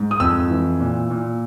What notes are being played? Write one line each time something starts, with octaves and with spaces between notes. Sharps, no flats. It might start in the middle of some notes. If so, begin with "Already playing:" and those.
Already playing: G#2
D#6
F2 E6
E3
A#2
A#2